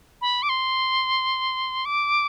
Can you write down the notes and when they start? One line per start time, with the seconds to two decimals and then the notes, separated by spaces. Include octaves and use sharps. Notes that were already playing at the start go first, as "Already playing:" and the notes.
0.21 B5
0.43 D6
0.49 C6
1.85 D6